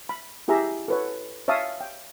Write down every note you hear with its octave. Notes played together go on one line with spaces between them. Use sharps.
B5
E4 G4 G#4 E5 A#5
A4 B4 C#5
C#5 E5 F5 A5 D#6
G5